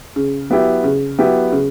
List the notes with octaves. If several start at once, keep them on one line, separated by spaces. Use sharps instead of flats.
C#3
F#3 B3 E4 G4
C#3
F#3 B3 E4 G4
C#3